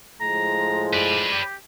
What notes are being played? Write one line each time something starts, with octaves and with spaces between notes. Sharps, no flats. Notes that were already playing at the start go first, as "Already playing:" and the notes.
A2 F3 G#3 A#5
B4 D5
G4